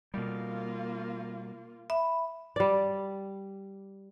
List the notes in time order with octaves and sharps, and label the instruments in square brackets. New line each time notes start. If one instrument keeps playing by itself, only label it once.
[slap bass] B2 G3 [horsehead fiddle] A#3 F4
[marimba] E5 [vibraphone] B5
[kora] G3 D5